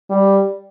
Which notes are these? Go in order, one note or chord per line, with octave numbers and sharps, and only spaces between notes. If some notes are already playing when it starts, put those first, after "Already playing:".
G3